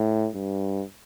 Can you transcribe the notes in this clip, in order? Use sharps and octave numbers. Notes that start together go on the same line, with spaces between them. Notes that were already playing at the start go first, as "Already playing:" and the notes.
Already playing: A2
G2